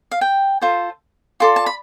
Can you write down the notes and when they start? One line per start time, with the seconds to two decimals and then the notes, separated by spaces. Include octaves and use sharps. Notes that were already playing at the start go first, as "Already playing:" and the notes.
0.12 F5
0.21 G5
0.62 F4 A4 C5
1.40 F4 A4 D5 C6
1.56 A5
1.66 B5